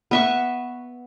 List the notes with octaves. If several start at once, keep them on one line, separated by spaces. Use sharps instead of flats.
B3 E5 C#6